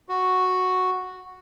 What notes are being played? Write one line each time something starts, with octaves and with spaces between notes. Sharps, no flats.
F#4